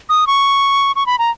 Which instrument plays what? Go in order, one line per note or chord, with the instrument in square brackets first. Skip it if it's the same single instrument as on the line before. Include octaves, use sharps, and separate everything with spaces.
[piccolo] D#6
C#6
C#6
B5
A#5